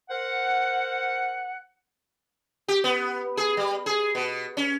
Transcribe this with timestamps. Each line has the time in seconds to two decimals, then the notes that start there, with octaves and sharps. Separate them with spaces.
0.10 A#4 C5 F#5
2.68 G4
2.84 B3
3.37 G#4
3.57 G3
3.86 G#4
4.15 B2
4.57 C#4